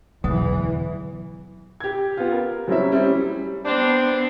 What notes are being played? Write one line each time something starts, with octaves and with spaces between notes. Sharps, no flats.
E2 B2 D3 E3 F#3 B3
G4 G#6
B3 F4
A#4
F#3 G3 C4 C#4 E4 E5
G3 C4 C#4 E4
B3 C4 D4